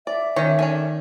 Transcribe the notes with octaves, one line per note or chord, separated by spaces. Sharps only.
D5 E5
D#3 C#4 C#5
C#4 D4 A4 G#5